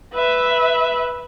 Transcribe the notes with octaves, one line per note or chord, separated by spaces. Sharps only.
B4 E5